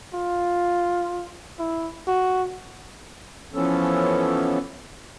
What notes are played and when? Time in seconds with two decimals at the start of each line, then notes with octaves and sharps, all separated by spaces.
0.14 F4
1.59 E4
2.07 F#4
3.54 E3 F3 B3 C#4 A4